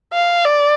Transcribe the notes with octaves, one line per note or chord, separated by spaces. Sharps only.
F5
D5